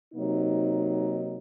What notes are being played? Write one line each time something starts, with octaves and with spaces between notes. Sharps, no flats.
C3 F#3 A#3 D#4